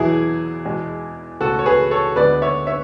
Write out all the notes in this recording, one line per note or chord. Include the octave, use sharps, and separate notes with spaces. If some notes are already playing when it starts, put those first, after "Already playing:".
Already playing: E2 B2 F#3 B3 E4 G#4
E2 B2 G#3
C#2 B2 A3 F#4 A4
C#5
G#4 B4
A4 C#5
D2 D3 G#3 B3 B4 D5
C#5 E5
C#5 E5